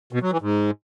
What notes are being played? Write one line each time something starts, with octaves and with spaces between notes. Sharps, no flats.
B2
F#3
E3
G#2